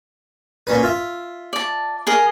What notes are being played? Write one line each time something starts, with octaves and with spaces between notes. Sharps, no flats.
A#2 C#4 B4
F4 E5
D5 A5
G#4 A#4 D#5